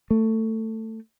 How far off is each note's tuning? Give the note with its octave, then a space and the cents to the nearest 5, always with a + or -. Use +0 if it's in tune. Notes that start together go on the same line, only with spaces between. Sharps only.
A3 +15